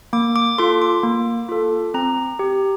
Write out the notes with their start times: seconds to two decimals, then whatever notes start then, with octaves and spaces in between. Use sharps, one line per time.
0.13 A#3 D6
0.36 D6
0.58 F4 A4 C6
0.82 D6
1.03 A#3
1.49 F4 A4
1.94 C4 A#5
2.39 G4